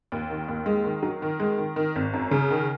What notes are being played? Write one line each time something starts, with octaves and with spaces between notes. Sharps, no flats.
D#2
D#3
D#2
G#3
D#3
F#3
D#3
G#3
D#3
D#3
G#1
F#2
C#3
D#3